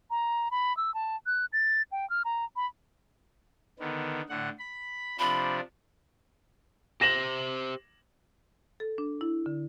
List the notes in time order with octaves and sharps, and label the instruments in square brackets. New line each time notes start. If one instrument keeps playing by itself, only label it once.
[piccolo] A#5
B5
E6
A5
F#6
A6
G5
F6
A#5
B5
[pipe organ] D3 D#3 B3
A2 D3 F#5
B5
[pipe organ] C3 F3 D4 [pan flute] B5
[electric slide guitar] G4 C5 [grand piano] A#6 E7 F#7
[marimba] A4
D4
E4
D3